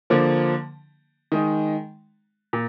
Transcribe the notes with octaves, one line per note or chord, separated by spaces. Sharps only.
D3 F3 A#3
D#3 G#3 D#4
A#2